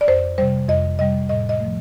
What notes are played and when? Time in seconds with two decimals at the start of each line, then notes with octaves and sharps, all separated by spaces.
0.01 D5
0.08 F2 C5
0.38 C3 G3 C5
0.69 F2 D#5
0.99 C3 G3 D#5
1.29 A2 D#5
1.49 D#5
1.60 F3 A3